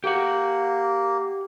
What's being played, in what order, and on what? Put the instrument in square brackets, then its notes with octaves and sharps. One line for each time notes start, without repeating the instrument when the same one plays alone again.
[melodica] A#3 [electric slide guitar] G4 F#5